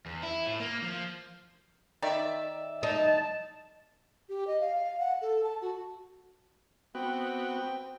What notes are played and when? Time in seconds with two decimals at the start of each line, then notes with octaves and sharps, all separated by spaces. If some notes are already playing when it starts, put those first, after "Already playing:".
0.06 E2
0.23 E4
0.47 A2
0.60 A#3
0.83 F3
2.02 D#3 D5 E5
2.83 D#4 A5
4.29 G4
4.47 D#5
4.61 F5
4.75 F5
4.99 F#5
5.22 A4
5.44 A5
5.62 F#4
6.95 B3 C4 F#4 G5